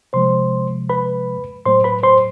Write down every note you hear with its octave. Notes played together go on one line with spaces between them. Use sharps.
C3 F3 G#3 C5 C6
B4 B5
A2 F#3 A3 C5 C6
B4 B5
C5 C6